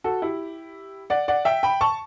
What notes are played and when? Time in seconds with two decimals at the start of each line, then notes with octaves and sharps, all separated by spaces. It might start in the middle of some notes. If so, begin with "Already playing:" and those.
0.04 F#4 A4
0.22 E4 G4
1.10 D5 F#5
1.28 D5 F#5
1.45 E5 G5
1.63 G5 B5
1.81 A5 C#6